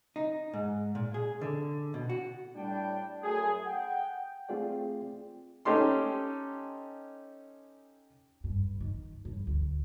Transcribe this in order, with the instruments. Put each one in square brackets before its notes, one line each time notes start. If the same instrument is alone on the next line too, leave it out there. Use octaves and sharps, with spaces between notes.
[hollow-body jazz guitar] D#4
G#2
A#2
G#4
D3
B2
F#4
[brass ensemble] A2 G3 D4 G5
F#2 A3 G#4
F#5 G5
[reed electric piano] A3 C4 F4 G#4 D5 G5
[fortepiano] C#4 D#4 G4 A4 C6
[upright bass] G2
D#3
G2
D2